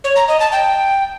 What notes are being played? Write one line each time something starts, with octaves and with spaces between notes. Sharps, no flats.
C#5
A#5
D#5
A5
G5